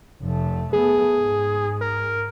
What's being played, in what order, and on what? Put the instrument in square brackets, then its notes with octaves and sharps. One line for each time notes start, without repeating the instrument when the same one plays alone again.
[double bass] F1 A3
[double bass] A3 B3 [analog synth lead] G#4
[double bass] G#2
[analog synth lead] A#4